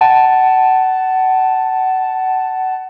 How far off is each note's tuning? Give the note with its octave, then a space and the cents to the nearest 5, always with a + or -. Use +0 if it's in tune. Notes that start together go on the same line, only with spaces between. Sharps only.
F#5 +25 A5 +0